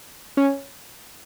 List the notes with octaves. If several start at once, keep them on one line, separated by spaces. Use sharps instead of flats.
C#4